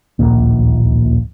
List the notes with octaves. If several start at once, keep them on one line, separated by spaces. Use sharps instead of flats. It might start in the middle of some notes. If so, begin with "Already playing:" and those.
D1 A#1 D#2 A#2